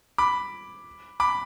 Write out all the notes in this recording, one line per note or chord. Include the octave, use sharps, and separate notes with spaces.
B5 D6
B5 D6